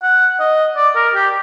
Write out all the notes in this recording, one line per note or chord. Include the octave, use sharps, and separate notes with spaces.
F#5
D#5
D5
A#4
G4